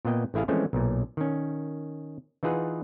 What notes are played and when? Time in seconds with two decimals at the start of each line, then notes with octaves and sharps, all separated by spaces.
0.05 A#2 A#3 B3 D#5 G5
0.34 A1 A3 E4 G#4 F5
0.48 E3 F3 G#3 A3 C4 C#4
0.73 B1 A#2
1.17 D#3 C#4
2.43 E3 D#4 F4 G#4 B4 F#5